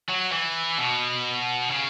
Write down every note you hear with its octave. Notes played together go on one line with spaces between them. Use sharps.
F#3
E3
B2
C#3